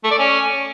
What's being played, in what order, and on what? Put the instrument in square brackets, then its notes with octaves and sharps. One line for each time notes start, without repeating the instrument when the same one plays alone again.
[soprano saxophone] A3
D5
C#4